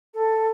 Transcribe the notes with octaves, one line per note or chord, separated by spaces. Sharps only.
A4